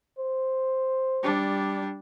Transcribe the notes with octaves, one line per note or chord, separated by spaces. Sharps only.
C5
G3 D4